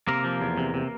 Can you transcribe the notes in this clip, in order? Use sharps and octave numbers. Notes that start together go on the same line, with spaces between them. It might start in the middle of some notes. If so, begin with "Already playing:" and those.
C3 A#3 A#4
F3
E2
C3
C3